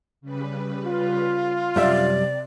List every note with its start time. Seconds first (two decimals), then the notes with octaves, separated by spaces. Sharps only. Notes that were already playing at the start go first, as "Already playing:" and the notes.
0.21 C#3 G3 B4
0.85 F4
1.76 F#2 C3 G3 D5 E5